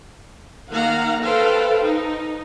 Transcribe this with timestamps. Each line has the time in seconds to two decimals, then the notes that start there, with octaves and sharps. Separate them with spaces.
0.71 D#3 A#3 F5 F#5 A#5
1.23 A4 B4 C5 F5 G5 A5
1.83 D#4